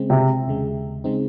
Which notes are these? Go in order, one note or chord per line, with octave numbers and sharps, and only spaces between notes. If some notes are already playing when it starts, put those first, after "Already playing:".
Already playing: C#3 G#3 C4
C3
D#2 C#3 G#3
C#3 G#3 C4 D#4